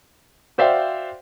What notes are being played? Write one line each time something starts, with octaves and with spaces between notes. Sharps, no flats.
F#4 C5 D5 E5 F5 G5